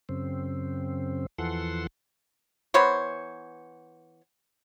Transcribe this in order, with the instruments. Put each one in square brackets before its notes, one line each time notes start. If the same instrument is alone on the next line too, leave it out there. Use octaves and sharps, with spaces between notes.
[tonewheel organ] F#2 C#3 C4
E2 E3 F3 A4 F#5 C6
[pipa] E3 B3 C5 C#5